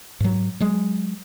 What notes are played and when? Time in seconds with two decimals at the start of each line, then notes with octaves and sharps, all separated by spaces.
0.20 G#2 F#3
0.60 F#3 G#3